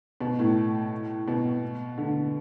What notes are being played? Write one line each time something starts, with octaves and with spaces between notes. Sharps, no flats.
B2
A2
B2
D3